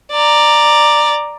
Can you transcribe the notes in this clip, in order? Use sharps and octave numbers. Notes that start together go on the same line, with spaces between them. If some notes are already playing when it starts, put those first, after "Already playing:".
D5 A#5